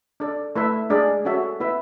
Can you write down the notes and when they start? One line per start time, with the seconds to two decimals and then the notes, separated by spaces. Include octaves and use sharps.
0.20 D4 A4 D5
0.56 A3 E4 B4 E5
0.90 G#3 D4 G#4 D5
1.25 C#4 F#4 A4 E5
1.60 B3 E4 B4 E5